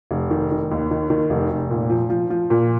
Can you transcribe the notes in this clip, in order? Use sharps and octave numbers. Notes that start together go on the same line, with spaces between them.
F1
D#3
D#3
D#2
D#3
D#3
F1
F1
A#2
F3
F3
F3
A#2